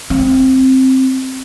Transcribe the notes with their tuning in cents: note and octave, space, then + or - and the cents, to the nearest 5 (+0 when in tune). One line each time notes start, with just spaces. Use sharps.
C4 +5